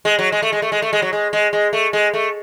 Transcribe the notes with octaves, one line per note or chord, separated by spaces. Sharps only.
G#3
F#3
G#3
A3
G#3
A3
G#3
A3
G#3
F#3
G#3
G#3
G#3
A3
G#3
A3